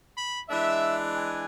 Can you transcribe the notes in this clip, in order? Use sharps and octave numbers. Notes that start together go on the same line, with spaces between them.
B5
E3 G#3 D4 E5
G#5